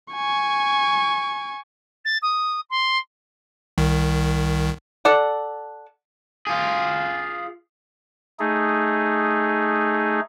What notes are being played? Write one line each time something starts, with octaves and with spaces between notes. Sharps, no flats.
G#5 C#6
A6
D#6
C6
C2 D#3
A4 D5 F#5
F4 G#4
A3 D#4 G#4